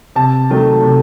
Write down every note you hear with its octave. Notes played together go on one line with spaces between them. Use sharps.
C3 A5
D#3 F#3 A3
C3